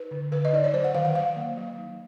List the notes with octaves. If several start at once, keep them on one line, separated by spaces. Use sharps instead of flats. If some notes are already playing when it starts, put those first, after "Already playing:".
Already playing: D#4 B4
D3
D3 B4
D#5
D#4 D5
C#5
F#3 C5
F#5
D#3 F5
F#5
F#3 F5
A#3
F#3
D#4